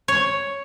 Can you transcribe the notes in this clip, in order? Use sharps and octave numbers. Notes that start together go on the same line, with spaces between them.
C#5